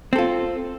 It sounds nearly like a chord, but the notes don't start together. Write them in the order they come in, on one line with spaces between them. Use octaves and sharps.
C4 A4 F4